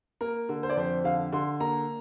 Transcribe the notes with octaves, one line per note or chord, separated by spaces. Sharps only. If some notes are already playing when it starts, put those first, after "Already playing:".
A#3 A#4
D3
C5
D5
F2 C5
D3 F5
D3 C6
A#3 A#5